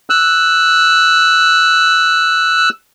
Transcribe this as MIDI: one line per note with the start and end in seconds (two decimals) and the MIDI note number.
0.10 2.69 88
0.10 2.69 90